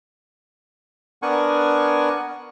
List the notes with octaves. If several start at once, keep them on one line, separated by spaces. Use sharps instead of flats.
B3 D4 A#4 F#5 G#5 C#6